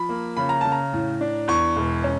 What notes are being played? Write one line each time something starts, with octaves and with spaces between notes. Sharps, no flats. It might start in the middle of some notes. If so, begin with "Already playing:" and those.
Already playing: F3 B5
A#3
C#3 B5
A#5
C#3 A5
A#5
A2
D4
E2 C#6
E1
C#4